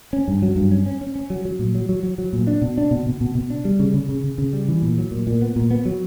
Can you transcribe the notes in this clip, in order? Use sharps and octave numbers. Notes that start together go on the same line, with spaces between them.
C#4
G2
F#3
G2
C#4
C#4
C#4
C#4
F#3
F#3
A#2
F#3
F#3
F#3
F#3
A#2
D4
B2
D4
B2
B2
B2
B2
D4
G3
C#3
C#3
C#3
C#3
C#3
G3
E3
A#2
F#3
A#2
A#2
B3
A#2
B3
F#3